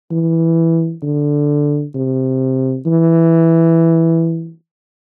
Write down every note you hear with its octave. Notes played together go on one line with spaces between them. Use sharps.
E3
D3
C3
E3